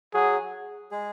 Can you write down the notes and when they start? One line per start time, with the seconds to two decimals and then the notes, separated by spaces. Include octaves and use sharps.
0.14 F#3 F#4 G#4
0.91 G#3 G#4